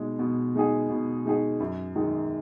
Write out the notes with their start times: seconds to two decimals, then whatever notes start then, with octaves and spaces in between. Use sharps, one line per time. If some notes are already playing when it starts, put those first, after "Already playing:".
Already playing: B2 G#3 D#4 G#4
0.19 B2
0.55 G#3 D#4 G#4
0.89 B2
1.26 G#3 D#4 G#4
1.60 F#2
1.96 D#3 G#3 D#4